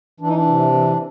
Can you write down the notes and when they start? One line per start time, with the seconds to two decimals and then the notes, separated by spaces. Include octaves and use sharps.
0.20 E3 D4
0.27 D#4
0.36 D4
0.47 C3
0.73 E3